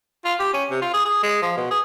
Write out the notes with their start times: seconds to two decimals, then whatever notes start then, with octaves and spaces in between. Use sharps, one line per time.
0.25 F4
0.40 G4
0.54 C#4
0.71 C3
0.82 F4
0.94 G#4
1.05 G#4
1.23 G#3
1.42 F3
1.57 B2
1.71 G#4